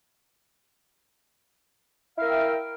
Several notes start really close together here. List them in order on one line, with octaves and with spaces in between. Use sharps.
E4 F5 A#4 E5 G5